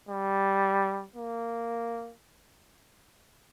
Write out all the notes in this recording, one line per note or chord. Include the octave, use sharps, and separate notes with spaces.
G3
A#3